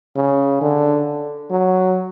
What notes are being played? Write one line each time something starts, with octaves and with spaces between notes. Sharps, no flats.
C#3
D3
F#3